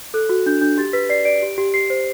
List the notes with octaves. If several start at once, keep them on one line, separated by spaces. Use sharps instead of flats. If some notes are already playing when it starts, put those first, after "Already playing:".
A4 F#6
F#4
D4 G6
D4 G6
G4 A6
B4 B6
D5 C7
D5 D7
G4
G4
G4 C7
C5